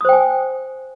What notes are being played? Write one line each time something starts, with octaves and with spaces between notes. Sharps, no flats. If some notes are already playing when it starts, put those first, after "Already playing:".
C5 G5 G#5 D#6